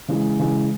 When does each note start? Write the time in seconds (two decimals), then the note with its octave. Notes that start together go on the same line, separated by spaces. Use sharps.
0.08 C#3 E3 G#3
0.39 C#3 E3 G#3